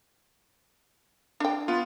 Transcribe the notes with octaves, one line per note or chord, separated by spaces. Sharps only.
D4 G5
B3 F4